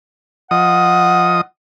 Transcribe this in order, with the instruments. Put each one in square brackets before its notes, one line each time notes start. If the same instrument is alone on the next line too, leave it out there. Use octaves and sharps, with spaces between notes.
[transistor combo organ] F3 D#5 D#6 [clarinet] F#5